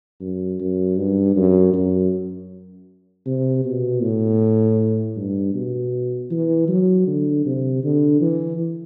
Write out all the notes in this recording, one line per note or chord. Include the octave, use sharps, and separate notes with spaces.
F#2
F#2
G2
F#2
F#2
C3
B2
A2
G2
B2
E3
F#3
D3
C3
D3
E3